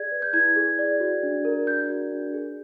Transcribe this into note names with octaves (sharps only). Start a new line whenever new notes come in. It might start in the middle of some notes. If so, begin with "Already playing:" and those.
Already playing: G#4 D5 G#6
B4
G6
E4 G#6
G#4
D5
F#4
D4
A#4
D4 G6
F#4
D4
G#4